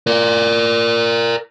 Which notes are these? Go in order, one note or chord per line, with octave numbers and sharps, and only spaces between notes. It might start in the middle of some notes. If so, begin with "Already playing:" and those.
A#4 D5